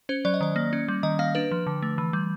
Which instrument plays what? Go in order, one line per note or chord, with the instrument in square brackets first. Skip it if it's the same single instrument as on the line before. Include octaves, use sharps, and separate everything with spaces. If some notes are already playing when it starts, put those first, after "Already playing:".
[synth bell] C#4 C5
F#3 D5
D#5
D#3 D5
A#3
C#4
G3
D#3 D#5
A#3 F5
D4 B4
F3
D3
A3
E3
G3